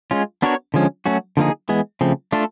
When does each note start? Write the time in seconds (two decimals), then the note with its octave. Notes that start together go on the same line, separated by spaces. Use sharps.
0.11 G#3 C#4 F4
0.42 B3 D4 F#4 A#4 C#5
0.74 D3 F3 G#3 C#4
1.06 F#3 A3 C#4 F#4
1.37 D3 F3 A#3 D#4 G#4
1.69 E3 G#3 B3
2.01 C#3 F3 A3 C4
2.32 A3 D4 F4 A4